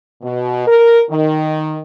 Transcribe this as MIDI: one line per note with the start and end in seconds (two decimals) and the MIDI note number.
0.22 0.66 47
0.67 1.02 70
1.10 1.80 51